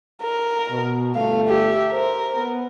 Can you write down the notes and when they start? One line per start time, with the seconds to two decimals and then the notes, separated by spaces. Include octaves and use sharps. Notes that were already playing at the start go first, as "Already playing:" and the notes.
0.23 A#4
0.70 B2
1.15 G1 A3 F5
1.48 G4 E5
1.92 A#4 C5
2.35 B3